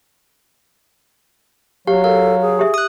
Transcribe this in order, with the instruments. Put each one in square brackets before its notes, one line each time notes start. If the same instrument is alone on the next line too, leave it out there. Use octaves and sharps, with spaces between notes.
[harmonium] F#3 [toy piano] G4 [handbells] F5
[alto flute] A4 [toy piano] A#4 [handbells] F5
[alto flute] G#4
[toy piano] G4 E5
[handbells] D#6 F#6